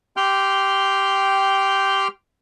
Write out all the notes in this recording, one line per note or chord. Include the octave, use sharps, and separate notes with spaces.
G4 G5 C6 F6 G6